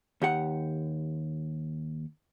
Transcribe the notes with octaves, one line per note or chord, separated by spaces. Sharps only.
D#2 G4 F#5